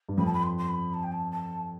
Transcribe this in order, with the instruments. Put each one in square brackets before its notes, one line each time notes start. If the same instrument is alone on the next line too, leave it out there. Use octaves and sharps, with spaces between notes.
[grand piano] G2
[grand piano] F2 [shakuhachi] B5
[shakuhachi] A5
B5
C6
C6
B5
A5
G5
A5
A5